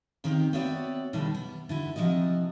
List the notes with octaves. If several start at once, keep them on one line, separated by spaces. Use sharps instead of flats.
C3 D#3 C#4 C5
B3 C4 F#4 C#5 D5 E5
B2 D3 D#3 G3 E4 A4
B3
D3 E4 F#4
C3 F3 G#3 E4 F#4 D#5